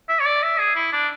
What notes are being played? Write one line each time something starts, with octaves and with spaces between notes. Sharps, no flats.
E5
C#5
D5
E5
G#4
E4
D4